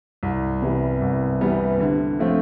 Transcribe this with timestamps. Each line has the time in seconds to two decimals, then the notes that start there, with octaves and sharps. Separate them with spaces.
0.23 C2
0.62 C3 E3 G3 B3
1.02 C2
1.41 C3 E3 G3 B3
1.80 D3
2.19 F3 A3 C4 F4